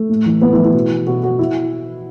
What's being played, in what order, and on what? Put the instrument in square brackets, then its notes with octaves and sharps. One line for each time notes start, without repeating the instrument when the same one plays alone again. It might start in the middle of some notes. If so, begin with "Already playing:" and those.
Already playing: [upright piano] A3
A2
E3
A2 B3
E4
E3
E4
B2
B2 F#4
F#4
E4